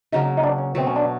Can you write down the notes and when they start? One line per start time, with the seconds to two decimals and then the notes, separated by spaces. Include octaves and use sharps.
0.12 C#3 F#3 A#3 D#4
0.37 D#4
0.43 D4
0.58 C#4
0.75 B2 F#3 A3 C4
0.87 C#4
0.96 D4